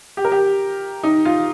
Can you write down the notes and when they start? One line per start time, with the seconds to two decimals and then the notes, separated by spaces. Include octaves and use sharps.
0.17 G4
0.25 A#4
0.32 G4
1.03 D#4
1.25 F4